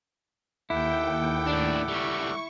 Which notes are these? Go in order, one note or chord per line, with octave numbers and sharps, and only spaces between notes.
D#2 E4 A4 F#5 G5 D6
A2 D4
C#2 G3 C#6